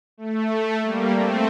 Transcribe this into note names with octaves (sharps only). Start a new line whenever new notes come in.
A3
G3 A#3
A3 C4